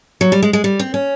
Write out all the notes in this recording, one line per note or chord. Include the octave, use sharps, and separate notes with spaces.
F#3
G3
G#3
G#3
G3
C4
C#4